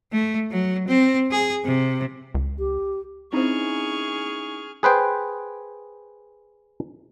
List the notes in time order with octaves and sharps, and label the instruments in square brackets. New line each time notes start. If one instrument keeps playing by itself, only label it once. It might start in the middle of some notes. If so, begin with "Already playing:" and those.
[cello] A3
F#3
C4
G#4
C3
[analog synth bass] C#2
[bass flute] G4
[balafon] C4 C5 [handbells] C#4 D#4 E4 [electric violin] G#4 F6 [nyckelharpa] C#6
[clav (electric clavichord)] G#4 B4 C5 G5